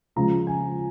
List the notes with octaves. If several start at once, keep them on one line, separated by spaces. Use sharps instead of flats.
C#3 F3 G#3 A#5
G#5